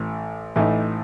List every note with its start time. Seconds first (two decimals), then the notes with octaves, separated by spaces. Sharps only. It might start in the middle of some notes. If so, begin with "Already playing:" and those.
Already playing: A1 A2 E3
0.56 A1 A2 E3 A3 D#4